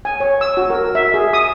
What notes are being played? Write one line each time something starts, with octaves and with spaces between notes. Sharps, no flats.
G#5
C#5
E6
F#4
A#4
E5
G#4
D#6